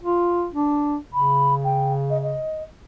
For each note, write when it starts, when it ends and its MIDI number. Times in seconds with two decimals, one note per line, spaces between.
0.03 0.48 65
0.54 0.97 62
1.14 2.41 49
1.14 1.55 83
1.64 1.93 79
2.10 2.21 75
2.23 2.63 75